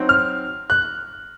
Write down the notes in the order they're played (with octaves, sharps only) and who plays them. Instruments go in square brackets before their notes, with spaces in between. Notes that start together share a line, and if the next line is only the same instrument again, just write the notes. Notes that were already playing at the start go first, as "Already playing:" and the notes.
Already playing: [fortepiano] F#3 C4 D#4 F#4 C5
[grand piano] F6
F#6